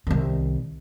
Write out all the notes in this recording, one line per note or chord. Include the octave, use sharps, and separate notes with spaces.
C2 D#3